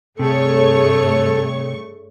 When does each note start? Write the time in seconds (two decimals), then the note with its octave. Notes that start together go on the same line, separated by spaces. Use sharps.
0.19 G2 C3 A3 G#4 A4 C#5 C#6